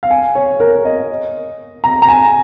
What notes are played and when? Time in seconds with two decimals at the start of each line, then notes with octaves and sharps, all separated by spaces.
0.03 F5
0.11 G#5
0.35 C#5
0.60 A#4
0.85 D#5
1.84 A#5
2.02 A#5
2.08 G#5